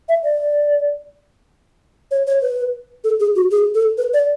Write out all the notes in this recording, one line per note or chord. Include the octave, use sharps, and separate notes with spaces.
E5
D5
C#5
C#5
B4
A4
G#4
F#4
G#4
A4
B4
D5